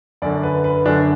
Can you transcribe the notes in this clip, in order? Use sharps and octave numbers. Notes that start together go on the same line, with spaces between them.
F#2 D3 D5
B4
B4
F#2 D3 D4